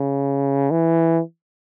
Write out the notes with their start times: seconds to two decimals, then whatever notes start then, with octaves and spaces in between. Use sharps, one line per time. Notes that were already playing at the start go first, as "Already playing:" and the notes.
Already playing: C#3
0.71 E3